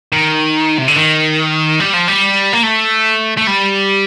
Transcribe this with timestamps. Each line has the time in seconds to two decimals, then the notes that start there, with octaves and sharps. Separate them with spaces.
0.13 D#3
0.78 C3
0.88 D3
0.96 D#3
1.80 G3
1.94 F3
2.08 G3
2.53 A#3
2.63 A3
3.37 A3
3.47 G3